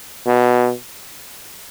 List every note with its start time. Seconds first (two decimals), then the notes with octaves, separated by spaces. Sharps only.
0.26 B2